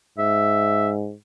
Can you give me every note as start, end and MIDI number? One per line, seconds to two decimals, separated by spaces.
0.18 1.14 44
0.18 0.89 76